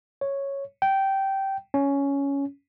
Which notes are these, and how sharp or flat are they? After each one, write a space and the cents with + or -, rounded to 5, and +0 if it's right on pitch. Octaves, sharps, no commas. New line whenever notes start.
C#5 -5
G5 -15
C#4 +10